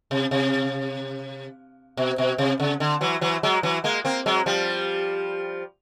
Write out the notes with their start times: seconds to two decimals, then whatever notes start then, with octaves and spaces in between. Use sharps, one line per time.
0.11 C3
0.31 C3
1.97 B2
2.18 B2
2.38 C3
2.60 C#3
2.80 D3
3.01 E3 F#3
3.21 E3 F#3
3.43 F#3 G#3
3.63 E3 F#3
3.84 G#3 A#3
4.05 A#3 C4
4.26 F#3 G#3
4.46 F3 G3